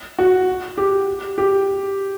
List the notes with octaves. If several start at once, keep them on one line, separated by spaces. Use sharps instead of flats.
F#4
G4
G4